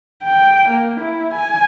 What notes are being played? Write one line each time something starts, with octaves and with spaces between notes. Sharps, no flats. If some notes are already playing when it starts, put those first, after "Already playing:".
G5
A#3
E4
G#5